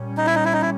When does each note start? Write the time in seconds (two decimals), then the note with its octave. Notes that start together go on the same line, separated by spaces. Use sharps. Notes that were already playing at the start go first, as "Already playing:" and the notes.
Already playing: A#2 G3 C#4
0.17 D#4
0.26 E4
0.35 D#4
0.45 E4
0.53 D#4
0.61 E4